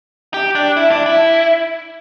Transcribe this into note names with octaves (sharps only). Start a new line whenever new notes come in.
G4
D4
E4
D4
E4